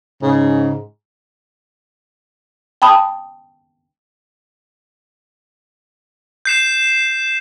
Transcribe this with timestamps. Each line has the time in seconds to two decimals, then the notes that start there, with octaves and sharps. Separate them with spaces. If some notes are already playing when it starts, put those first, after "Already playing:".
0.23 G#2 C#3
2.82 G5 A5 B5 D#6
6.45 G6 C7 E7